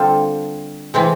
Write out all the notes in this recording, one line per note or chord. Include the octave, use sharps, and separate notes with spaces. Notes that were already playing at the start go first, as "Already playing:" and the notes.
Already playing: D3 G3 C4 F4 A4
C3 E3 G#3 C4